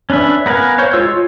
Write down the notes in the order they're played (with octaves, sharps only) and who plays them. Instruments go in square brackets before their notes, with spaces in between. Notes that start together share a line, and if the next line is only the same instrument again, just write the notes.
[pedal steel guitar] C#4 D4 B4 E5
B3 A#4 B4 F5 G#5
C5 C#5 F5
G#3 F4 C#5 E6
F4